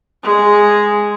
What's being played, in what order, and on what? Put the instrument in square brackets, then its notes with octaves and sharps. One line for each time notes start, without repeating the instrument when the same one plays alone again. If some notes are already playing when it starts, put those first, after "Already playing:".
[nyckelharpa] G#3 G#4